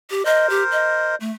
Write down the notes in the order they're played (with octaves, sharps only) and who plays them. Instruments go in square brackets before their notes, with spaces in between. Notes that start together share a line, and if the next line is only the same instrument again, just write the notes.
[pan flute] G4
[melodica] A#4 C5 [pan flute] D#5
[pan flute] G4
D#5
A3